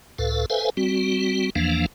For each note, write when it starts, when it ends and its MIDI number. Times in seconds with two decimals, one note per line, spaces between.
0.18 0.46 37
0.18 0.46 45
0.18 0.46 69
0.18 0.46 71
0.18 0.46 77
0.50 0.70 69
0.50 0.70 71
0.50 0.70 72
0.50 0.70 76
0.50 0.70 77
0.50 0.70 80
0.77 1.50 55
0.77 1.50 60
0.77 1.50 66
1.56 1.86 40
1.56 1.86 52
1.56 1.86 53
1.56 1.86 58
1.56 1.86 62
1.56 1.86 77